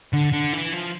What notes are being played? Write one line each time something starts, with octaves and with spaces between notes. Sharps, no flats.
D3
D3
E3
F3